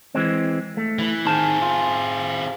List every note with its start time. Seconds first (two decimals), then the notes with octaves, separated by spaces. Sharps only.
0.15 E3 G#3 C4
0.77 A3
0.99 E3
1.25 D#3 C4 G#4 A5
1.62 F4